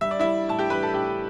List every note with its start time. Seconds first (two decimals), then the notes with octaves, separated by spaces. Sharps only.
0.01 G3 E5
0.11 D5
0.20 G3 E4 E5
0.48 A2 A5
0.59 G4 G5
0.70 G3 B4 B5
0.82 A4 A5
0.94 A2 G4 G5